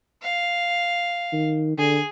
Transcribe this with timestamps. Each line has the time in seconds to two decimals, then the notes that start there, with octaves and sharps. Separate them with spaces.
0.23 F5
1.33 D#3
1.78 D3 G#4